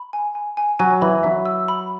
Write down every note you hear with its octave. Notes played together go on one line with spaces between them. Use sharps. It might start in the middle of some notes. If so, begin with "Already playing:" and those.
Already playing: B5
G#5
G#5
G#5
F#3 G#5
E3 B5
F#3 E5
E6
B5